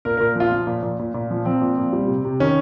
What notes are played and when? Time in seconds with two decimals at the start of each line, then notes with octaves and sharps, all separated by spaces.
0.05 A#2 A#4
0.17 A#2 A#4
0.36 F3 F4
0.52 F3
0.67 A#2
0.83 A#2
0.99 A#2
1.14 A#2
1.31 F3
1.45 F3 C4
1.61 A#2
1.77 A#2
1.93 G3
2.08 C3
2.24 C3
2.40 D#3 C#4